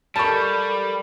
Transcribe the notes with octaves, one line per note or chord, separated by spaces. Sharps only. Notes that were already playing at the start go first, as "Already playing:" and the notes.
G3 A4 A#4 A5 B5 C#6